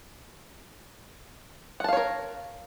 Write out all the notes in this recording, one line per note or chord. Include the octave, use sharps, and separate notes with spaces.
A#4 C#5 F5 F#5 A5